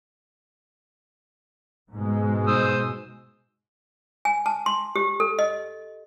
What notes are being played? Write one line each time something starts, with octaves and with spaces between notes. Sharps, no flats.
G#2 B2 G#3
C5 D#6 E6
G#5
A5
C6
G4
A4
D#5